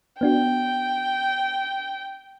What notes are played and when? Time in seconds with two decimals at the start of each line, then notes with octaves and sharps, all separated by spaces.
0.21 B3 D4 F#4 G5